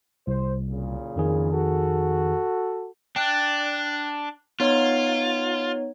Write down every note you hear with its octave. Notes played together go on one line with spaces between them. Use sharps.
C2 C5
F#1 A#2 C#3
F2 D#3 G#4
F#4 A4
D4 G5 F#6
B3 D#4 F4 C#5